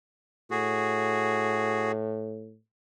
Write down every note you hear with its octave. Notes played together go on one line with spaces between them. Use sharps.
A2 F#4 G#4